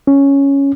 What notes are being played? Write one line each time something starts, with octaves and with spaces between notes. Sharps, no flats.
C#4